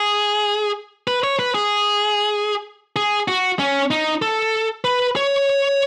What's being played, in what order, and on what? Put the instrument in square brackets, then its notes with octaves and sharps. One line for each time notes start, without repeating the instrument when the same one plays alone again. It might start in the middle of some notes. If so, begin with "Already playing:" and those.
Already playing: [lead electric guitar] G#4
B4
C#5
B4
G#4
G#4
F#4
C#4
D#4
A4
B4
C#5